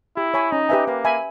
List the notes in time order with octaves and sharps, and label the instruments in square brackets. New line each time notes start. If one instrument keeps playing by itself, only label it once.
[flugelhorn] E4 [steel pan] G4
[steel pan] C#5 G#5 B5
[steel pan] C#4 [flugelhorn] D#4
[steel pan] G4 B4 E5 G#5
[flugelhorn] A#3 [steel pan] B4
[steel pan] E5 G#5 B5